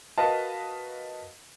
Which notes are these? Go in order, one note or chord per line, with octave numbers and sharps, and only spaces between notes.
F#4 A#4 B4 D#5 F5 A5